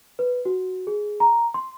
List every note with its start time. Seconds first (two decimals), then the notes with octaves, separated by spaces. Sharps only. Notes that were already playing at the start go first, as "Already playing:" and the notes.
0.19 B4
0.45 F#4
0.87 G#4
1.20 A#5
1.54 C6